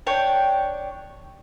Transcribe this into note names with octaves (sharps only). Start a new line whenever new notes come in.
D4 C#5 G5